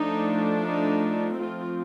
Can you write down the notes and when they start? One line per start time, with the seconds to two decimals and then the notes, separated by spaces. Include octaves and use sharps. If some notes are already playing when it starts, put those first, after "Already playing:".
Already playing: F3 A3 D4 D#4
0.62 D#4
1.38 F3 A3 C4 F4